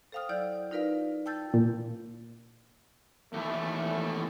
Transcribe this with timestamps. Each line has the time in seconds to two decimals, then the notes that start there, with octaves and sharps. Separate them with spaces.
0.12 A4 C5 F5 G5 D#6 F6
0.29 F#3 E4 D5 G6
0.71 D#4 F4 A#4 B4 D5 F5
1.26 G5 A5 E6 G6 A6
1.54 A#2
3.33 D#2 E3 A3